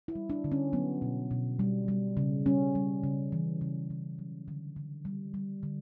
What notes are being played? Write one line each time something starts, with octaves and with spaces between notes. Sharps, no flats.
E4
G3
D4
D3
C#4
F#3 B3
B2
B2
G3
G3
C#3
G3 C#4
G3
C#3
E3
C#3
C#3
F#3
D3
D3
G3
G3
D3